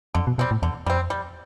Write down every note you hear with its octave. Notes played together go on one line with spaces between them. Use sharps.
F2 D3
B2
B2 G3 C4
A2
E2 D3
F2 G3 C4
G3